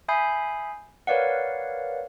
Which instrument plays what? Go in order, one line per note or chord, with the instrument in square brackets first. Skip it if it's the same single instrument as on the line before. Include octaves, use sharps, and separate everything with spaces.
[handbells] E5 G#5 B5 D#6 G6 C7
A#4 B4 C#5 D5 F5 F#5